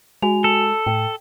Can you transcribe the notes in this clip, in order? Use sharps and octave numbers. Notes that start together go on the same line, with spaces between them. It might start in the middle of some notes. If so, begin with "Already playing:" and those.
G#3 F#4 G#5 F7
A4
A2 G5